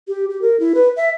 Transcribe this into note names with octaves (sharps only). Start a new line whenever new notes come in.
G4
G4
A#4
E4
B4
E5